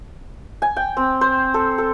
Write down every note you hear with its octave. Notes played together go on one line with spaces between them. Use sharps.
G#5
G5
C4
C5
A4
A4